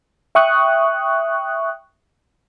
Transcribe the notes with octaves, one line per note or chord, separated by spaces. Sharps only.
E5 G5 C#6 D#6 F#6